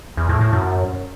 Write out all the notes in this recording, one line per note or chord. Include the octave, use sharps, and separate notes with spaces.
E2
A2
A2
F#2